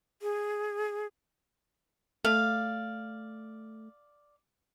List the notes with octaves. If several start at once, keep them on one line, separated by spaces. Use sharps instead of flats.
G#4
A3 D5 F5